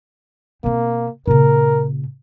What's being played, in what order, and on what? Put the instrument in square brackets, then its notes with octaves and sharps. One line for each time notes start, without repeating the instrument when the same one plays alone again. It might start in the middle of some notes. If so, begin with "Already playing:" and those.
[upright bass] B2 C4 [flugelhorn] A#3
[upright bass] A#2 C#3 [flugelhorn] A#4